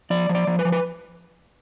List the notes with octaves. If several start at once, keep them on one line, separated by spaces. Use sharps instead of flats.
F3 D5
F3
D5
F3
B4
F3
B4